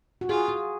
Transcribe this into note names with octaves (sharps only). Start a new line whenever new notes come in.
F#4
F4 G#4
F4